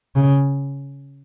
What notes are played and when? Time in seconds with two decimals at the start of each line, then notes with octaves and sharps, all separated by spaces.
0.15 C#3